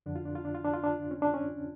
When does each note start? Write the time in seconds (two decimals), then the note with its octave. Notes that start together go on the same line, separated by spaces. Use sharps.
0.06 F2 D3 D4
0.16 F4
0.25 D4
0.35 F4
0.45 D4
0.55 F4
0.64 D4
0.74 F4
0.84 D4
1.11 C#4
1.22 D4
1.34 C#4